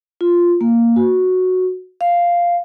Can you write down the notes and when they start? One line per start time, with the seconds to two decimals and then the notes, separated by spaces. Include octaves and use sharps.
0.21 F4
0.61 A#3
0.96 F#4
2.01 F5